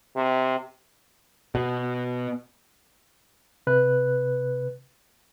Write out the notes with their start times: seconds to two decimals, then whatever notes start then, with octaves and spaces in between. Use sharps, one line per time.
0.16 C3
1.55 B2
3.67 C3 B4 F#6